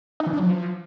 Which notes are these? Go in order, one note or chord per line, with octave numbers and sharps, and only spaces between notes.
D#4
E3
D4
F#3
F3